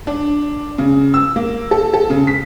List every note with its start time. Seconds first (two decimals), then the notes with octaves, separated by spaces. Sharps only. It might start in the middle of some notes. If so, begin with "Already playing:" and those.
0.07 D4
0.78 C#3
1.14 E6
1.36 A#3
1.71 A4
1.94 A4
2.10 C#3
2.27 B6